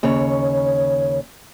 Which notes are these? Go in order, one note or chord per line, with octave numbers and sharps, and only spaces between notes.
D#2 C#3 C#5